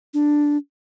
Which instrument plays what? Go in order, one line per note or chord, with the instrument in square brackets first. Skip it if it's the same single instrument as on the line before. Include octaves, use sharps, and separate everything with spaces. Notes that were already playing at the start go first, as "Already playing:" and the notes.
[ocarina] D4